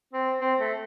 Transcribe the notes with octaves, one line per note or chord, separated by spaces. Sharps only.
C4
C4
A3